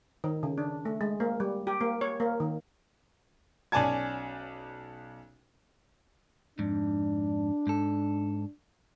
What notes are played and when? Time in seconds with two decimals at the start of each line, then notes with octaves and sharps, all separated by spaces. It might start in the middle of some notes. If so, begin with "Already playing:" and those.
0.24 D#3
0.43 C#3
0.58 D4
0.85 A3
1.01 G#3
1.20 A#3
1.40 G3
1.67 G4
1.81 A#3
2.01 C#5
2.20 A#3
2.40 D#3
3.72 B1 C#4 D5 G#5 A5 G#6
6.59 F2 G#2 D4
7.67 G#2 A4